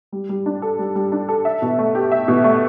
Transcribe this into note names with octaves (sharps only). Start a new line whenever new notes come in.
G3
G3
D4
A4
G3
G3
D4
A4
E5
B2
A3
G4
E5
B2
A3